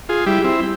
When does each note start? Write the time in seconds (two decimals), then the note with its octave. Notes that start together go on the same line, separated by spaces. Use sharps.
0.09 F4 G#4
0.26 G3 E4 G4
0.44 C4 E4